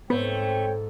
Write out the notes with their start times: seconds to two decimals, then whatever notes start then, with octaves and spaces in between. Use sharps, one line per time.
0.10 G#2 A3 B3 C4 C#5 G5